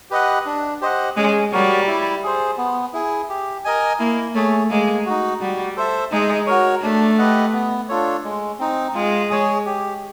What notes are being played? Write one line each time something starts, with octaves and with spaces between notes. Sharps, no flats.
G4 B4 D#5 F#5
D4
G4 C5 D#5 F#5
G#3 C#4
G3 F#4 A#4 C#5
E4
G#4 C5
B3
E4 G#4
G4
A#4 D#5 G#5
A#3 E4
A3 G#4 C#5
G#3 A#3
D#4 F#4
G3 F#4
A4 C5 E5
G#3 D#4
F#4 A#4 C#5
A3 D4
G4 B4 D#5 F#5
B3
D4 F4 A4 C#5
G#3
C4 D#4
G#3 F4
G#4 C#5
G4